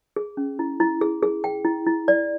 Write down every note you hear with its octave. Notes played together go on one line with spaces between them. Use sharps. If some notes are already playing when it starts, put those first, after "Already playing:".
G#4
C#4
E4
E4
G#4
G#4
G5
E4
E4
D5